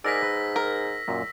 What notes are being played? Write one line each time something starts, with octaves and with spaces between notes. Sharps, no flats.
G#2 G#4 A#4 D5 E6 A#6 B6
B4
A#4
F#2 A#2